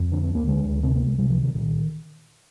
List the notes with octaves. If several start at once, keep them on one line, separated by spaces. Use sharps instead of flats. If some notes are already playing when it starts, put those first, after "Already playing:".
Already playing: F2
D3 D4
C4
D2
A#3
D3 G#3
D2
C3 C4
A#3
C2
G#3
C3 G3
F3
C2
D#3
A#2 D#3